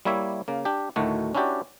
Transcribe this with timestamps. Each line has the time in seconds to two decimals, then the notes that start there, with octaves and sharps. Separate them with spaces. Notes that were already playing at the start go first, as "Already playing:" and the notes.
0.05 G3 A#3 E4 C#5 E5
0.48 C#3 A#3
0.65 D4 G4
0.96 D2 A2 D#3 A3 F#4
1.35 C#4 D4 E4 F#4 G4 D5